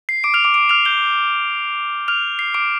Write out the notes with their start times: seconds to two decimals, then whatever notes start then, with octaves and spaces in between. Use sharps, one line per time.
0.09 C7
0.24 D6 D7
0.34 F6 F7
0.44 D6 D7
0.54 D6 D7
0.69 F6 F7
0.85 G6 G7
2.08 F6 F7
2.39 C7
2.54 D6 D7